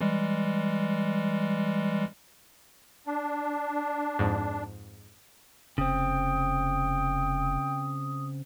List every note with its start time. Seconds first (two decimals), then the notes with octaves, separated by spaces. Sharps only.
0.01 E3 G3 G#3
3.06 D4
4.19 F2 G#2
5.78 F1 C#3 C4 G5 D#6